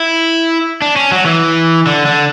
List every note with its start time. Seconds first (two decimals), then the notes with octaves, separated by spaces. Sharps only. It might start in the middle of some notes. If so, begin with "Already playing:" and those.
Already playing: E4
0.82 D4
0.96 C#4
1.12 F#3
1.26 E3
1.87 D3
2.06 D3